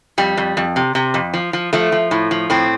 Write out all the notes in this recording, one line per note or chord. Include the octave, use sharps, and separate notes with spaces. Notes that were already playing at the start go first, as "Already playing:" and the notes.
F2 G3
F2
F2
C3
C3
F2
F3
F3
F3 A3
F3
A2
F3
A2 C4